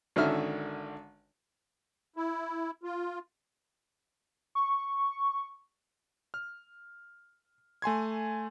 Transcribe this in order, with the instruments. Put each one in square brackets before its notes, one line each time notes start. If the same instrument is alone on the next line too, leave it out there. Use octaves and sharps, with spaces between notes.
[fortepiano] G#1 D3 D#3 C#4 E5 F6
[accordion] E4
F4
[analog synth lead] C#6
[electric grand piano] F6
A3 G#5 C6 G#6